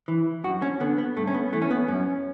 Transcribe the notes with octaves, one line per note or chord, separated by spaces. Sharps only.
E3
F#2 F#4
C#4
D3 B3
B3
G2 A3
C#4
B3
E3 A3
C#4
B3
F#2 C#4